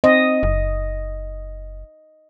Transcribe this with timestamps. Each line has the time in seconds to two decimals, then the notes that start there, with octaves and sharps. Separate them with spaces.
0.04 C4 D#5
0.43 F#1